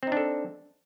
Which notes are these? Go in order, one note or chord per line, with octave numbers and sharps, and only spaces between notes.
C4 D4 D#4 A4